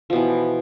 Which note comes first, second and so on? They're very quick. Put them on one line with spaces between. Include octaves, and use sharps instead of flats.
F3 B2 E3